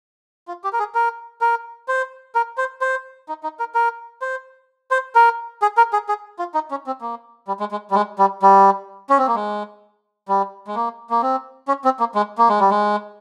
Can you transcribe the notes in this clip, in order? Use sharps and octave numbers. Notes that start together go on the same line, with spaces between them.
F4
G4
A#4
G#4
A#4
A#4
C5
A#4
C5
C5
D#4
D#4
A#4
A#4
C5
C5
A#4
G#4
A#4
G#4
G#4
F4
D#4
C#4
C4
A#3
G3
G#3
G#3
G3
G#3
G3
G3
C#4
C4
A#3
G#3
G3
G#3
A#3
A#3
C4
C#4
C4
A#3
G#3
A#3
G#3
G3
G#3